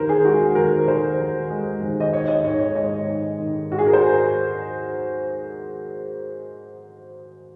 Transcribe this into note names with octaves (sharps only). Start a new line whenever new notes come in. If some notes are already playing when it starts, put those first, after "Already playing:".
Already playing: D#2 D#3 A#4 C5
G#4
G#3 F#4
D#2 A#4
D#3 C5
D#2
G#3
D#2
D#5
D#3 C#5
C#5
D#5
G#2 C#5
C#5
G#3 D#5
G#2
D#3
G#2 F#4
G#4
A#4
C5